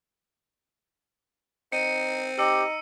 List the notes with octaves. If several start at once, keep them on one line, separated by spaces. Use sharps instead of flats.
C4 D#4 C#7 D#7
D#4 G4 E6 C#7